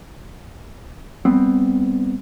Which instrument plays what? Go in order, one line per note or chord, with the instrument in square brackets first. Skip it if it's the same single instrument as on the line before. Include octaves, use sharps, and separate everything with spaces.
[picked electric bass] G3 B3 C4